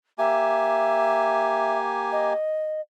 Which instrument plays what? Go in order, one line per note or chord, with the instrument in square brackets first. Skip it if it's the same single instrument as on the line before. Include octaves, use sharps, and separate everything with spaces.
[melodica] A#3 G4 G#5 [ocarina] E5
[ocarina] D#5